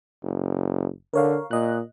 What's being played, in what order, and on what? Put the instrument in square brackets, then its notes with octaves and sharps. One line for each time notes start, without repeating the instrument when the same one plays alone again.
[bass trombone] F#1
[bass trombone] D3 [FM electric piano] A#4 C#5 F5
[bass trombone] A#2 [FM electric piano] D#5 F#6